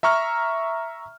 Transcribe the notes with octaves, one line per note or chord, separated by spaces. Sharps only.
E5 A#5 C#6 F6